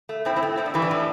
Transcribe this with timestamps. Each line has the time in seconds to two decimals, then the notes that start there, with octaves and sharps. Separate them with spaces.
0.09 A3
0.25 A2 C4 E4
0.36 C4 E4
0.43 A3
0.57 A2 C4
0.66 D4
0.74 E3 G3
0.82 D4
0.91 A2